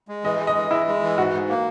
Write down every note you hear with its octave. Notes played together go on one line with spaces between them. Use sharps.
G#3
E3 D#5
G#3
D#5
E3
G#3 E4
G#3
E3
G#2 F#4
G#2
A#3